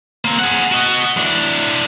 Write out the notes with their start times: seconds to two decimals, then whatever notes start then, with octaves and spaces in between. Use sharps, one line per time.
0.25 A#3 C4
0.39 G#4 F#5
0.72 F#4 D#5
1.17 E3 D4